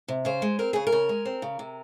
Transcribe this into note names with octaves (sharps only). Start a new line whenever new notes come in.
C3
C#3 C5
G#3
C4 A#4
C#3 G#4
A#4
C#3
G#3
C4
C#3
C3